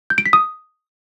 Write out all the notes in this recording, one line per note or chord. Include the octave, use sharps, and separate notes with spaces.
G6
D7
B6
D#6